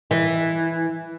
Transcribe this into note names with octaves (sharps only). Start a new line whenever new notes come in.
E3